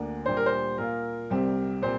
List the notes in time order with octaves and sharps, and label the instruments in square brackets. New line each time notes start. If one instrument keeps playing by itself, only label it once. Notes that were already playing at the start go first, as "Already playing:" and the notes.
Already playing: [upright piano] D2 D3 A#3 D4
[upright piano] A#2 G3 D4 G4 [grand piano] C5
[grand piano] A#4
C5
[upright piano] A#2 A#3 F4 [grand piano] A#4
[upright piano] C2 C3 G3 C4 G4
[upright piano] A#2 G3 C4 [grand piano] C5